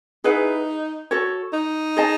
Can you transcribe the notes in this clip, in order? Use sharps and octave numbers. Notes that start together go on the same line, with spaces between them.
D#4 E4 G#4 B4 F#5
F#4 A4 C#5
D#4
G#4 D#5 A5